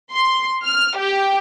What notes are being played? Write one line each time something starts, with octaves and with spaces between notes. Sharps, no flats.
C6
F6
G4